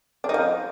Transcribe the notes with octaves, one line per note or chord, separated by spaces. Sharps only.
D4
D#4
F3